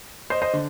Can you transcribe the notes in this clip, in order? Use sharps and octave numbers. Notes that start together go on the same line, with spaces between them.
C5 D#5
C5 D#5
D3